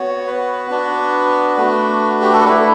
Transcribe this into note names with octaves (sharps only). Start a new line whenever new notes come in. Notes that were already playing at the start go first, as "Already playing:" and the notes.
Already playing: B3 F#4 C#5
B4
B3 D4 F#4
A3 D4 F#4
G4
A4
A3 E4 B4